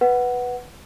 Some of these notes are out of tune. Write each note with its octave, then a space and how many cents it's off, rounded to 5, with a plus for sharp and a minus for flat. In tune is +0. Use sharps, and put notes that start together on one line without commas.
B4 +0 F#5 +0